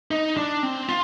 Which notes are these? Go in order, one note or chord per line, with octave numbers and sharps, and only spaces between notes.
D#4
D4
C4
F4